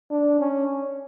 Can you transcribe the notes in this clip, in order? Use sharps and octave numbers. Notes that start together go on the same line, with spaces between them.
D4
C#4